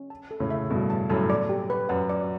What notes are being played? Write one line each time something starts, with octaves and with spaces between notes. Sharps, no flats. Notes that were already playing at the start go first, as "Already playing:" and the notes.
Already playing: C#4
A5
A4
A2 C#3
E5
G2 B2 A4
A5
F#2 A2 A4
D5
G4
B4
F#2 F#5
D5